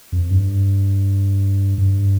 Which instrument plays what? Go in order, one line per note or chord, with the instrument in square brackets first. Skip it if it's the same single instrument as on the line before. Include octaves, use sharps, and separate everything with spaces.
[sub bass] F2
G2
G2